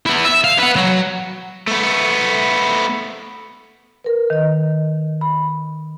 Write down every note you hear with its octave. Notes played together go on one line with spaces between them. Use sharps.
B3 E4
E5
F5
B4 F#5
F#3
A3 B3
A#4 B4
D#3 D#5
B5